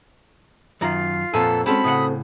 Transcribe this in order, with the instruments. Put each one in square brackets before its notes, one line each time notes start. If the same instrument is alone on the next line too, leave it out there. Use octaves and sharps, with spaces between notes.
[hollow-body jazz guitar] F#2 D#3 A#5 [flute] F4
[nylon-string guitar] F2 A#2 B3 [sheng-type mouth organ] A4 E6 [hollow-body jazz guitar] G#5
[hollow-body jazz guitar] G#3 C#4 [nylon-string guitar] C4 F#4 A4 [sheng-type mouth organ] B5
[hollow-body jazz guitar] A2 C#3 F#5 [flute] D#6